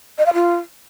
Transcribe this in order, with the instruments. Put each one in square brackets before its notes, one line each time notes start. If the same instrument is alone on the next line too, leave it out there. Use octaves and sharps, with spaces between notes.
[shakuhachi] D#5
F5
F4